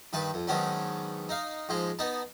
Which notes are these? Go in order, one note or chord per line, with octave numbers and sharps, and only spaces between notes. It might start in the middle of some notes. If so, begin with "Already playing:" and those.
G2 D#3 B4 A5
F2
G#2 D#3 F#3 B3 C#4 D4
D#4 F5
G#2 F3 G#3
B3 D#4 A5